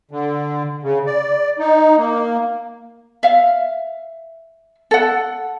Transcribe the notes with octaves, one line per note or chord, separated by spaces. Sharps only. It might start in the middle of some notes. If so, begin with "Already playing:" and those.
D3
C#3
D5
D#4
A#3
E5 F5
A4 F#5